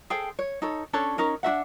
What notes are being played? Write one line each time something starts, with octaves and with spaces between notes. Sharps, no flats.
G#4 A4 C5 G5
C#5
D#4 A4 C#5
C#4 D4 A4 C#5
C#4 D#4 A#4
D4 F#4 E5 F#5